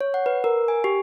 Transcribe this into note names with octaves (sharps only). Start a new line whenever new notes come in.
C#5
F#5
B4
A#4
G#5
G4